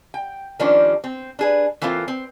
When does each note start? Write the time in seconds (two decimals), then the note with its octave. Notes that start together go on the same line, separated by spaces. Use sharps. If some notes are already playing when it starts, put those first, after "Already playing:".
0.14 G5
0.59 D#3 F3 G3 A#3 C#4 D4
1.04 C4
1.39 D4 G#4 B4
1.82 E3 A#3 C4 F4 G4 A4
2.08 C4